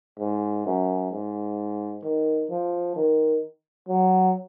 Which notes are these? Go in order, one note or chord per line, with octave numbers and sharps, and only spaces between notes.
G#2
F#2
G#2
D#3
F3
D#3
F#3